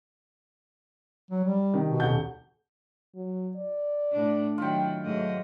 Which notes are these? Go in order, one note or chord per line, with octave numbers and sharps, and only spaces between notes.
F#3
G3
C3 D#3
B2
D#1 F#5 G6
F#3
D5
A2 D4
D#3 F#3 E4 F4 G5
G#2 F#3 A3 D#5